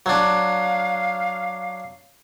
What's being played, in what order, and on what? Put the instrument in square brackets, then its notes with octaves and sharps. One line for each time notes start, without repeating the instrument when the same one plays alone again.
[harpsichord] F#3 D4 [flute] F5